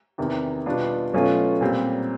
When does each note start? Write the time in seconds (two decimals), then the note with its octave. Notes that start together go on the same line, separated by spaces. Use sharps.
0.18 E2 C3 D#3
0.66 B2 G3 B3 D4 F4
1.13 B2 F#3 A3 C#4 F4
1.61 A#2 G3 C4